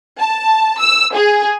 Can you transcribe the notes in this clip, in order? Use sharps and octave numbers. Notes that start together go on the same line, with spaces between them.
A5
E6
G#4